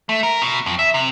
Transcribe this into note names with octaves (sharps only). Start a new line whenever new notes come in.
A3
A#4
B2
F2
E5
C3